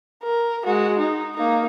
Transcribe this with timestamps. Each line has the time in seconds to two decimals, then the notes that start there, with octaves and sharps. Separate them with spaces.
0.24 A#4
0.65 G#3 F#4
0.99 D#4
1.37 A#3 D#4